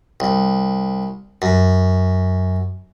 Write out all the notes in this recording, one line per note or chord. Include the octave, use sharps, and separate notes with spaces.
C2
F#2